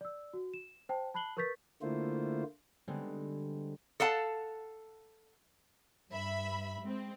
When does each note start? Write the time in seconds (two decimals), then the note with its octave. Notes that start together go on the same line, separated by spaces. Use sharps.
0.01 D5 E6
0.33 F#4
0.54 E7
0.89 C5 G5 A5
1.14 A5 B5 F#6 C7 F#7 G7
1.37 A#4 B4 C#6 G6 A6 B6
1.82 D3 A3 A#3 E4 F4 C5
2.88 D3 G3 G#3 B3 C4
4.00 A4 F5 F#5 A5
6.10 G2 E5 B5
6.81 G#3 C4